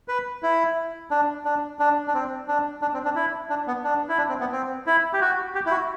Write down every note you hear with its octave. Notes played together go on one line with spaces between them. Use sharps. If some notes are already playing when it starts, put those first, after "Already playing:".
B4
E4
D4
D4
D4
D4
C4
D4
D4
C4
D4
E4
D4
B3
D4
E4
D4
C4
B3
C4
E4
G4
F#4
G4
E4
F#4